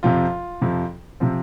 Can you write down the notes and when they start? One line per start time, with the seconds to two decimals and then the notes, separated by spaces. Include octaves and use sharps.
0.03 F2 C3 F3 F4
0.61 F2 C3 F3
1.20 C3 F3 C4